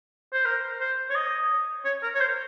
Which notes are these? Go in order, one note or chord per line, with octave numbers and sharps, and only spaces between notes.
C5
A#4
C5
C#5
D#5
C#5
A#4
C#5
C5